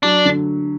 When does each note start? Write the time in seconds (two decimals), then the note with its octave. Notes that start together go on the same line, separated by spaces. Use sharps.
0.03 F#3 D4
0.25 D3